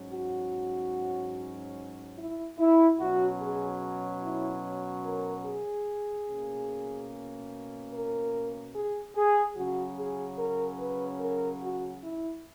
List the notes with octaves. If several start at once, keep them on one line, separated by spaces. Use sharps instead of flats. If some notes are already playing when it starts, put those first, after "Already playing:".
Already playing: G#2 F#3 C#4
F#4
E4
E4
B2 F#3 C#4 F#4
G#4
E4
A#4
G#4
B2 A#3 C#4
A#4
G#4
G#4
C#3 F#3 C#4 F#4
G#4
A#4
B4
A#4
F#4
E4